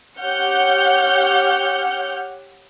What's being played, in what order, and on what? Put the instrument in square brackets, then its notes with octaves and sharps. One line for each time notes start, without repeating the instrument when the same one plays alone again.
[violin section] G4 C#5 F#5 F6 G6